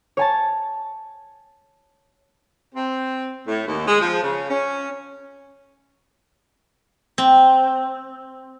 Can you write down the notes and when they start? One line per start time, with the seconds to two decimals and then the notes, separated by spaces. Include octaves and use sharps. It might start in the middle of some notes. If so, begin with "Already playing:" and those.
0.17 C#5 G#5 A5
2.75 C4
3.48 A2
3.67 D#2
3.88 G#3
4.01 F3
4.23 C#3
4.50 C#4
7.18 C4